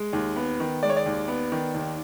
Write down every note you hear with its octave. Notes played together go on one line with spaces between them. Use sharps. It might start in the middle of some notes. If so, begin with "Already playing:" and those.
Already playing: G#3
D#2
B3
D#3
G#3 D5
C#5
D5
D#2
B3
D#3
D#2